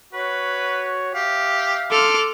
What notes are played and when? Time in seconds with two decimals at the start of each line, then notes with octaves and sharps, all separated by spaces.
0.13 F#4 B4 C#5
1.14 G4 E5 F5
1.91 A4 C6 D6 F6